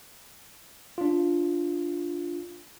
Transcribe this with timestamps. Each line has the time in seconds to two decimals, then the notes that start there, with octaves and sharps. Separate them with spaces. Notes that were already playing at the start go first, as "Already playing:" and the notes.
0.98 D4 F4